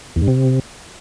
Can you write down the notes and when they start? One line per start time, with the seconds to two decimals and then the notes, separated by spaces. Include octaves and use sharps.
0.16 E2
0.22 G2
0.28 C3